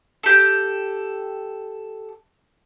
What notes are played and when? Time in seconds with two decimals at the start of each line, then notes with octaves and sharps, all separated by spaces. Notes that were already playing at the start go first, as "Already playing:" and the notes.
0.23 G4 A4